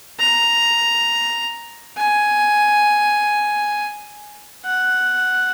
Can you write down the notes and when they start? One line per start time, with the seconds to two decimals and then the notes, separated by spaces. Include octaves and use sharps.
0.19 A#5
1.98 G#5
4.65 F#5